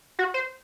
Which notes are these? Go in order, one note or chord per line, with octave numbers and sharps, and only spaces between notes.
F#4
C5